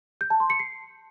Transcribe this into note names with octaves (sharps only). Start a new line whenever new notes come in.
G6
A5
C6
C#7
C7